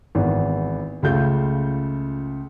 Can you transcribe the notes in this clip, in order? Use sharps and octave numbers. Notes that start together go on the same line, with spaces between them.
G#1 E3 B3
C#2 C#3 A3 F4 G6